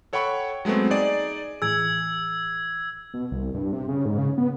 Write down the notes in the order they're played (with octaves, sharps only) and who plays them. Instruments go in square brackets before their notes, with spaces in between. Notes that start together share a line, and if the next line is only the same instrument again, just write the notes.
[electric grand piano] A4 C#5 F#5 G5 B5 C#6
F#3 G#3 A3 B3 C4
D#4 G#4 D5
[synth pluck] A2 E3 G#4 [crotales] E6 G#6
[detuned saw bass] B2
C2
G2
C3
C#3
G#2
C#3
B3